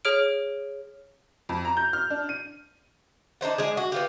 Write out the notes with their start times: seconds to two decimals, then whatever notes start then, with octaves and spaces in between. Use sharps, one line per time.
0.05 G#4 C#5 F6 D7
1.49 F2
1.65 A#5
1.77 G6
1.93 F6
2.10 D4
2.29 D#7
3.41 D4 D#4 C5 F#5
3.58 G#3 D4 G#4
3.77 F#4
3.92 B3 F4 G4